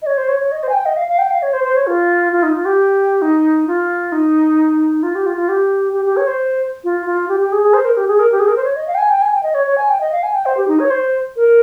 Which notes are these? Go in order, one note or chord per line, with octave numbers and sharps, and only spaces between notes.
D#5
C#5
C5
C#5
C#5
D#5
C5
G#5
G5
D#5
F5
F5
G5
F5
C#5
C5
C5
C#5
F4
F4
D#4
F4
G4
D#4
F4
D#4
F4
G4
F4
F4
G4
G4
G4
C#5
C5
F4
F4
G4
G4
G#4
G#4
C5
A#4
G4
G#4
A#4
G4
G#4
A#4
C5
C#5
D#5
F5
G5
G#5
G5
G#5
G5
D#5
C#5
C#5
G#5
G5
D#5
F5
G#5
G5
C5
G4
D#4
C#5
C5
A#4